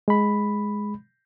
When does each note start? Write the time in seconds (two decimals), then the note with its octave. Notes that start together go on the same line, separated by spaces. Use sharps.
0.08 G#3 B5